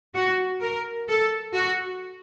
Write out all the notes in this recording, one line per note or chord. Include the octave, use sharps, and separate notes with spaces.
F#4
A#4
A4
F#4